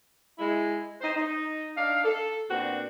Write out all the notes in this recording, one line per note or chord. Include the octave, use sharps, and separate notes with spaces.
G#3 E4
D#4 C5
D#4
D4 D#4 F5
A4
A#2 B3 C4 D4 F#4